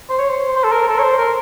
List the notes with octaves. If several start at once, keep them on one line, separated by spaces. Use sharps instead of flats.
C5
C#5
C5
C5
A4
A#4
A4
C#5
C5
A#4